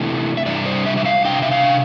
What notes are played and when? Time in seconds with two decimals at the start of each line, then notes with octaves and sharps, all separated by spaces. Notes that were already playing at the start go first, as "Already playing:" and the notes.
Already playing: C3 E3 A3 D4
0.37 E5
0.46 C3 G3 D4 D5
0.66 C5
0.86 E5
0.97 E5
1.05 F5
1.25 C3 G3 D4 G5
1.42 E5
1.52 F5